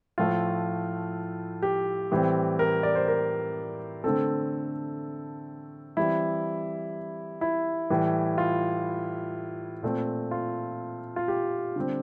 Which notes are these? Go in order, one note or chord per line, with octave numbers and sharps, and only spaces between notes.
A2 F3 A3 F4
G4
A2 E3 G3 C4
A#4
D5
C5
A#4
D3 A3 C4 A4
E3 G3 C4 E4
E4
A2 E3 G3
F4
A#2 A3 C4
F4
F4
G4
D3 G3 C4